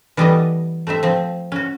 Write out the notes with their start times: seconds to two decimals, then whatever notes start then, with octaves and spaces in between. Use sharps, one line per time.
0.17 E3 G3 B3 G4 A4 D#5
0.87 A3 C4 C5 E5
1.03 F3 C4
1.52 C#4 F#4